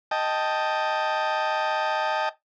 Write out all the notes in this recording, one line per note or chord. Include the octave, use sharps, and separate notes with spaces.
D#5 G5 A5